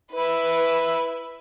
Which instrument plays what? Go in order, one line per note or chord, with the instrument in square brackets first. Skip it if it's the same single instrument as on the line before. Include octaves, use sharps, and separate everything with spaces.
[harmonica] E4 [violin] B4